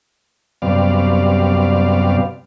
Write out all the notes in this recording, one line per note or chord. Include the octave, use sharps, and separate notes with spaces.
F#2 C3 G3 B3 D5 F5